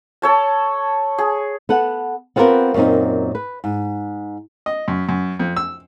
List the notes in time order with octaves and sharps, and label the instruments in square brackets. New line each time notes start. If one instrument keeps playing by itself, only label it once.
[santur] A4 C#5 A5
G#4
[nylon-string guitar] B3 A4 F#5
B3 C4 F4 G4 A#4 B4
F#2 A#2 C4 D#4
B4
G#2
[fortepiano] D#5
F#2
F#2
F2
E6